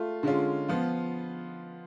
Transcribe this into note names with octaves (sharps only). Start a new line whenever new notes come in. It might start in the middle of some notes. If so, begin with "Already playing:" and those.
Already playing: A3 F4
D3 G#3 C#4 F4
F3 B3 F4